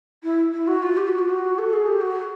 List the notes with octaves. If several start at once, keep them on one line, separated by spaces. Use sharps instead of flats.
E4
E4
F#4
F4
G4
F#4
F4
F#4
A4
G#4
G4
F#4